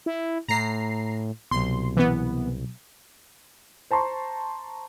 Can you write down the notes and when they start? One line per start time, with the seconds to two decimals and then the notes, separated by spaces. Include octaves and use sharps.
0.06 E4
0.48 A2 A#5 C7
1.51 C2 B2 F#3 C6
1.97 E3 B3
3.91 C5 A5 A#5 C6 C#6